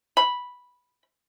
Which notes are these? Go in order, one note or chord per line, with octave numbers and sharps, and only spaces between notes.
B5